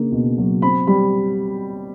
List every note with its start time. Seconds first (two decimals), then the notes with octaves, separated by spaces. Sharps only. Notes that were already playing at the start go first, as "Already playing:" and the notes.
Already playing: C#3 A#3 D4
0.12 B2
0.38 F#3
0.62 C4 B5
0.87 G3 B5